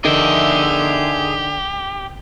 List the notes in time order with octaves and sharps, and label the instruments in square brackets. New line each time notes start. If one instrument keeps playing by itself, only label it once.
[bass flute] D3 [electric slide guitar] D#4 A#4 D#5 [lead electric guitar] G4 [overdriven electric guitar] G#4 E5